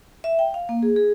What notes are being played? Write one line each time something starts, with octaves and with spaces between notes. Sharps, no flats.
E5
G5
F5
A#3
G#4
G#4